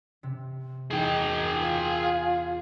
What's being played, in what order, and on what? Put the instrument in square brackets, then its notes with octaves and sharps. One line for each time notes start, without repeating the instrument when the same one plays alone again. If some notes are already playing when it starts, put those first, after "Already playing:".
[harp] C3
[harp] E2 [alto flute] D#4 [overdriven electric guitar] G#4 G5
[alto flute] F4 [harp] G#5